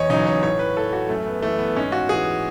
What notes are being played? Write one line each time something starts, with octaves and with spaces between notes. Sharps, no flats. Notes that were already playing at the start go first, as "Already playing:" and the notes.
Already playing: E2 C#5 D#5
C#3 F#3 D#4
C#5
A2 C#5
B4
E3 A4
F#4
F#2 A3
B3
E3 A3
B3
G#2 C#4
F#4
E3 G#4